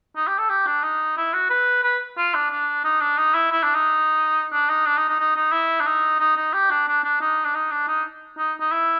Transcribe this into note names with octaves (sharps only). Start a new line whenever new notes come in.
D#4
G4
A4
G4
D4
D#4
E4
F#4
B4
B4
F4
D4
D4
D#4
D4
D#4
E4
E4
D4
D#4
D4
D#4
D4
D#4
D#4
D#4
D#4
E4
D4
D#4
D#4
D#4
G4
D4
D4
D4
D#4
D4
D#4
D4
D#4
D#4
D#4
E4